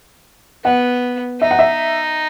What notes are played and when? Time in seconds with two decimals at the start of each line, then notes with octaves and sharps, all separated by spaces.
0.64 B3 F#5
1.41 D#4 E5
1.51 F#5
1.59 E5